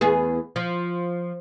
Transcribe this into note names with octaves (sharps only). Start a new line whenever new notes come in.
E2 B3 G#4
F3